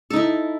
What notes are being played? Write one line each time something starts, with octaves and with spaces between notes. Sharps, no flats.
D#4 E4 A4